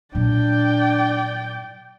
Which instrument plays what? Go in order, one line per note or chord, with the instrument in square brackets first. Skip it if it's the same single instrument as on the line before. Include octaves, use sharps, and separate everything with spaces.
[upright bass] A#2 F#3 [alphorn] D4 [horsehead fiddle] D5 G5